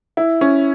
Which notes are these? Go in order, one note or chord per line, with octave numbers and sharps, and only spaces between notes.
E4
C#4